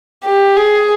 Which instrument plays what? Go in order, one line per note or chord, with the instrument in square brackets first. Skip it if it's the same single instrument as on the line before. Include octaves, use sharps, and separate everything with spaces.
[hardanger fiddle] G4
G#4